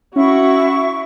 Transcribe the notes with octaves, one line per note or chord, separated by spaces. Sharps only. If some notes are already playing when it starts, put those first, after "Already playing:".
C#4 E4 F#4 C#6